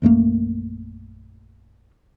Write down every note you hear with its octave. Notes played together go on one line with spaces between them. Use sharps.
A#1 F#2 A3 A#3